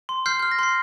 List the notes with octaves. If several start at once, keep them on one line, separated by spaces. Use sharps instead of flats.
C6
F6 G6 C7
F6 G6
A#6
C6 C7